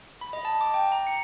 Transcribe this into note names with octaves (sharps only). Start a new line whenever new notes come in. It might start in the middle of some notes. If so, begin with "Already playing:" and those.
B5
D#5
A5
D6
G5
A#5
C#7